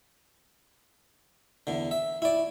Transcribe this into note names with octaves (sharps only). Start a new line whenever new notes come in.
E2 D3
E5
E4 D5